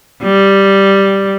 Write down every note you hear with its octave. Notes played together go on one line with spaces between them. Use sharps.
G3